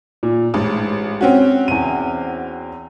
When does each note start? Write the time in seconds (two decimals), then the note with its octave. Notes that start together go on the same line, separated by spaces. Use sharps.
0.23 A#2
0.54 A1 G#2
1.21 C4 C#4 F#4
1.68 E2 D#7